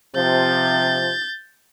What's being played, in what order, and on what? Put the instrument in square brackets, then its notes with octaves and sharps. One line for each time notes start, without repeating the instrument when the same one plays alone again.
[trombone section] C3 F3 [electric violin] G6 A6